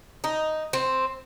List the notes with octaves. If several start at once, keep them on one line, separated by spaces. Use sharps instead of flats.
D#4
C4